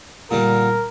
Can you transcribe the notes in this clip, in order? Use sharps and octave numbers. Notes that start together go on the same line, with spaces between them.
A#2 D3 G3 A#4